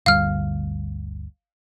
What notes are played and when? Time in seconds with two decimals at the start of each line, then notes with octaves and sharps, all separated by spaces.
0.06 G1 D2 G3 F5 F6